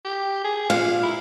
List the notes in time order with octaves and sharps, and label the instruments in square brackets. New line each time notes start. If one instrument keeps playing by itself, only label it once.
[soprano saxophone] G4
G#4
[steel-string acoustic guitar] A#2 [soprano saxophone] F5
[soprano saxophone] E4